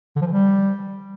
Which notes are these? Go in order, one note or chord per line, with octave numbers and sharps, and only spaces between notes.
D3
F3
E3
G3